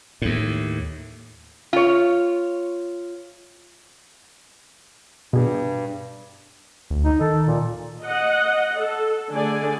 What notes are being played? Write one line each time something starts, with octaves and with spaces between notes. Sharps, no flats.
D#2 A2
F4 C#5
G2 B2 G#4
D2
D#4
D#3 A4
A#2
D#5 F#5
A4
D3 A3 G#4 D5 G#5